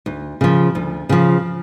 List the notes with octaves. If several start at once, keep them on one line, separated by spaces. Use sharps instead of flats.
D2
C#3 F3
D2
C#3 F3